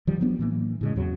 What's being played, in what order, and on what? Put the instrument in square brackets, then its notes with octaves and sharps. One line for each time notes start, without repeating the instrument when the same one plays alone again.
[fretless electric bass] D#3 F3 G3
F#3 B3 D4
A2 E3 A#3
A2 C#3 G#3
E2 C#3 F#3